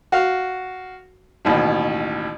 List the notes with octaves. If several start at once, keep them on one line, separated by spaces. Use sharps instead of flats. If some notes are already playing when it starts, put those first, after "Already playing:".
F#4 F5
A1 D#2 B2